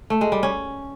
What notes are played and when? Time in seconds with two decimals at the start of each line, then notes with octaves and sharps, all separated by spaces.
0.10 A3
0.21 G#3
0.32 G3
0.43 C#4